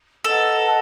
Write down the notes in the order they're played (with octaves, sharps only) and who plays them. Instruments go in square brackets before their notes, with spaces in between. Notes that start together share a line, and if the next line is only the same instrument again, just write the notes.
[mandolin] A4 [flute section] B4 D#5 F#5 A#5